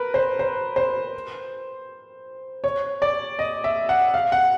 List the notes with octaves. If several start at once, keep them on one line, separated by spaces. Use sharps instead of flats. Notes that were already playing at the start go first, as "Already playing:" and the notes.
Already playing: A#4 B4
C5
C5
C5
C#5
D5
D#5
E5
F#5
F5
F#5